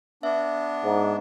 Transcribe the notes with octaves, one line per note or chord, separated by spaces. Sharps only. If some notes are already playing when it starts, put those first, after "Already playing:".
B3 D4 E5
G#2